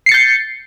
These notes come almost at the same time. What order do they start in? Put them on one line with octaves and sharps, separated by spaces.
C7 C#7 A6 G6